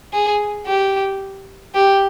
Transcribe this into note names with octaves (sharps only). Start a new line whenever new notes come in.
G#4
G4
G4